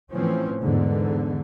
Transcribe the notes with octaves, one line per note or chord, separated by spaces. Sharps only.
A2 E3 F3 C4 C#4
E2 G#2 D3